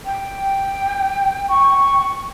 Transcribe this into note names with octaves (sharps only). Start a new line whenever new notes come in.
G5
C#6